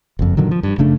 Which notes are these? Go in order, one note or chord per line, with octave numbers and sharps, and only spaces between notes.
F#1 F2
A#2 D3 D#3 F#3
F3
G2
F#1 C#3 A3 D4